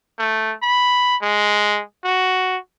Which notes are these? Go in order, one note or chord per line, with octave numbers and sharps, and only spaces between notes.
A3
B5
G#3
F#4